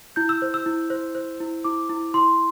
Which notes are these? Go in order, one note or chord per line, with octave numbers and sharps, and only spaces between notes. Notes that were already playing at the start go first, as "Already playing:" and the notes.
E4 G6
E6
C5
E6
E4
C5
C5
E4
E4 D6
E4
E4 C6